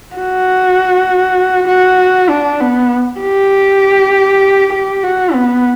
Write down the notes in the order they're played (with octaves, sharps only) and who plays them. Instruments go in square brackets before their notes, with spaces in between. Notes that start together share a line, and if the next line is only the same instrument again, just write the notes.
[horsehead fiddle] F#4
F#4
D4
B3
G4
G4
F#4
B3